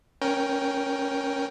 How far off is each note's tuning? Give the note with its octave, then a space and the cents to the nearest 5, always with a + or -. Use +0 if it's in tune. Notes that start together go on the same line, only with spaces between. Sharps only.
C#4 +0 A#4 +20 G5 +0